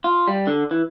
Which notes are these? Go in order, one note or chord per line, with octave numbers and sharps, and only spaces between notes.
F4
G3
D3
E3